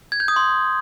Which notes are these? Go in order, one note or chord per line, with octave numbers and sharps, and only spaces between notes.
G#6
G6
D#6
C6